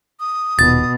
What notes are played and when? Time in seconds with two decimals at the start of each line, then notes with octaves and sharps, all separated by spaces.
0.20 D#6
0.59 D#1 B2 A6